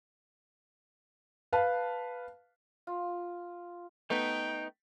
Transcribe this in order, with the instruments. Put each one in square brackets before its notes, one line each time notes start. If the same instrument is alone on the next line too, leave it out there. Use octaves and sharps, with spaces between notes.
[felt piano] B4 F5 A5
[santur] F4
[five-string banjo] A3 B3 [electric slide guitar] D#4 [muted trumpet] G5